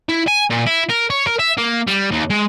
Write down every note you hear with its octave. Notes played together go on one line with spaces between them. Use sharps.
E4
G#5
A#2
E4
A#4
C#5
A#4
E5
A#3
G3
D#2
G#3